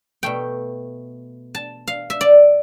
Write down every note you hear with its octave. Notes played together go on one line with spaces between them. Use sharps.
B2 A3 G5
A5
F5
E5
D5